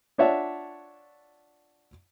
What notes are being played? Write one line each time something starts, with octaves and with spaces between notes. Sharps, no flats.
D4 F4 C#5 E5 F#5 A5